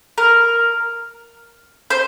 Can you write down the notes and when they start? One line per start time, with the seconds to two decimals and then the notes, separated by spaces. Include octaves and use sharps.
0.18 A#4
1.90 C5